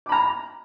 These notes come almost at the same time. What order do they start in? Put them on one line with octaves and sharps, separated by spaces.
D6 B5 A#5